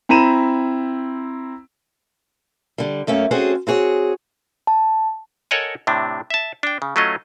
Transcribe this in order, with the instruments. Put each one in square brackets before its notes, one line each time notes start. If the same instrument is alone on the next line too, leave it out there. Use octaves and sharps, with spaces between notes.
[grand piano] C4 E4 A#5 B5 D#7 E7
[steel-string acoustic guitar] D3 G3
F#2 A3 A#3 C#4
C4 C#4 F#4 G#4 A4 C5
C4 F#4 G#4 C#5
[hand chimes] A5
[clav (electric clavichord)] A4 A#4 C#5 D#5 F#5 G#5
A2 C3 C4 D4
E5 A5
D4 G5
C#3
F#3 A3 C#4 F4 D#5